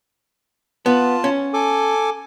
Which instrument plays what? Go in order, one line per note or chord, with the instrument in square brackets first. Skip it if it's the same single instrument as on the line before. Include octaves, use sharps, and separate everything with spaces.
[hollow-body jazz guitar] B3 [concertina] F4 A5
[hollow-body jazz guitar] C#4
[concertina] A4 G#5 D6